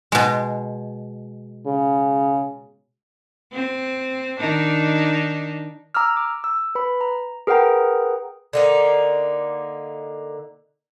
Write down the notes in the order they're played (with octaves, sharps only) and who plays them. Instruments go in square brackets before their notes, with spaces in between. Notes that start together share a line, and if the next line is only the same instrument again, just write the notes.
[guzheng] B2 G#3
[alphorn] C#3
[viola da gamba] C4
D#3 D4 D#4
[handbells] A#5 D6 E6 F6
D6
E6
B4 B5
A#5
G#4 A#4 B4 F#5 G5 A#5
[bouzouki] D3 A#3 D#4